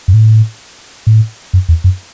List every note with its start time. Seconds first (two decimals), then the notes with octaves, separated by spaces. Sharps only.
0.08 F#2
0.14 A2
1.07 A2
1.53 F#2
1.69 E2
1.84 F#2